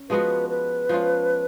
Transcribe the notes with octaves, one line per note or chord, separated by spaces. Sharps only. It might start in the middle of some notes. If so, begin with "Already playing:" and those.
Already playing: C#4
F3 G#3 B3 F#4 B4
B4
F3 G#3 C#4 F4